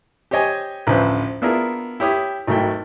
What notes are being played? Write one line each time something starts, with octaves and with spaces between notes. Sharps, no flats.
G4 C5 C#5 D#5 G#5
A1 D2 F3 B4 C5
B3 D4 E4 F4 G#4 A#4
E4 G4 C#5 D#6
G#1 F#3 A3 E4 G5